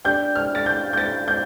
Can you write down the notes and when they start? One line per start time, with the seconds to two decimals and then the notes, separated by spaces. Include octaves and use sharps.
0.05 D4 G4 D5 G5 G6
0.35 F6
0.55 A6
0.66 G6
0.93 G6
0.98 A6
1.28 G6